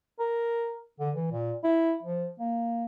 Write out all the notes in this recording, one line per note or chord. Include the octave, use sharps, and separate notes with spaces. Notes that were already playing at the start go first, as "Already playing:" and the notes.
A#4
D3
E3
A#2
E4
F3
A#3